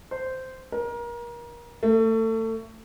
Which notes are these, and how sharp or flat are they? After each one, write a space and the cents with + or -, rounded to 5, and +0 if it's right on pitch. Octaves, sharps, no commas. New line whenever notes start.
C5 -10
A#4 +30
A3 +30